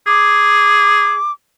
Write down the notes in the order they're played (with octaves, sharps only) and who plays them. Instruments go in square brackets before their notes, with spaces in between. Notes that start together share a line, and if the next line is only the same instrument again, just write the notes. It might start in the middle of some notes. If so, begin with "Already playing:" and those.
[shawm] G#4 [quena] D6